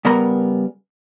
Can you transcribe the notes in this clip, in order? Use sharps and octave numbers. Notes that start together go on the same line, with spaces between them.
C#3 G3 B3 A#4 A#5